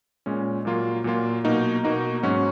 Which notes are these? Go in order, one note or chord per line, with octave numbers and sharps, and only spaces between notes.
A#2 G#3 C#4
A#2 F#3 A#3 F4
A#2 F#3 A#3 F4
B2 A#3 D#4 F#4
B2 A#3 D#4 F#4
G#2 F#3 C#4 F#4